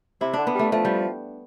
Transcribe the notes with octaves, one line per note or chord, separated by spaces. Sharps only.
C3 E4
D3 D4
B3
G3 A3
F3 A3
G3